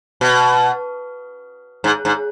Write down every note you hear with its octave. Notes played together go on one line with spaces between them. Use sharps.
B2
G#2
G#2